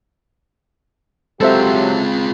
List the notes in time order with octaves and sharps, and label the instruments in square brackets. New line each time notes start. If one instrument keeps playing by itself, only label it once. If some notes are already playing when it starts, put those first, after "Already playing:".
[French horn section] F#3 G4 [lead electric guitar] G#3 F4 [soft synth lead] C4 [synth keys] A4 C5 E5